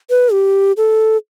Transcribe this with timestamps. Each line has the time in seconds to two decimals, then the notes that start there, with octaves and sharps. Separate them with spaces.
0.10 B4
0.32 G4
0.77 A4